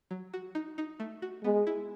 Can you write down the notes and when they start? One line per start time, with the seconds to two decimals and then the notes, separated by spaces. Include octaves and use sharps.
0.11 F#3
0.33 F#4
0.55 D#4
0.78 D#4
1.00 A3
1.22 F#4
1.44 G#3 B3
1.67 E4